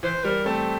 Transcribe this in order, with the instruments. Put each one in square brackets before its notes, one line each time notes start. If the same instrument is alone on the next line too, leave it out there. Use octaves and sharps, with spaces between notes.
[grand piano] E3 [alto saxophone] C5
[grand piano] G3 [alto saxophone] A#4
[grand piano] A3 [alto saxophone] C4